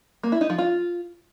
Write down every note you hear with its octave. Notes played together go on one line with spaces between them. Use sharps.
A#3
E4
D#4
F3
F4